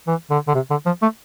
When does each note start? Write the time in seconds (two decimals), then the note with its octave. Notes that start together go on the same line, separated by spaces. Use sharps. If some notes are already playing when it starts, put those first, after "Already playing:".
0.08 E3
0.31 D3
0.48 D3
0.55 C3
0.70 D3
0.86 F3
1.02 A3